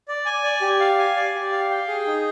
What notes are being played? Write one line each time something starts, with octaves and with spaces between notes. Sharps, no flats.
D5
G#5
D5
G4
F5
G#5
D5
G4
F5
G5
G#4
D#4